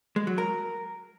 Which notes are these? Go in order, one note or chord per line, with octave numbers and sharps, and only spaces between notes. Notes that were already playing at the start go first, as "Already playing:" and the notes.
G#3
F#3
A#4